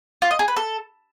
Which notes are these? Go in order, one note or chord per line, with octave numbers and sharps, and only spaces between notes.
F4
D#5
G#4
B4
A4